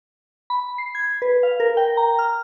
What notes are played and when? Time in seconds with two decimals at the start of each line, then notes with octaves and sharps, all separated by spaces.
0.50 B5
0.78 C7
0.95 G#6
1.22 B4
1.43 F5
1.60 A#4
1.77 G5
1.97 A#5
2.19 F6